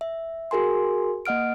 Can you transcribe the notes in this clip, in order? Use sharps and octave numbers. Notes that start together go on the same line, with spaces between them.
E5
F#4 G#4 A#4 G#5 C6
A#3 D#5 F#5 F6 D7